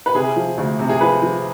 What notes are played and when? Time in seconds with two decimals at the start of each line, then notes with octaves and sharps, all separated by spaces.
0.06 B4
0.15 C3 G#4
0.36 F3
0.58 D2
0.79 C3
0.89 G#4
1.01 F3 B4
1.22 F3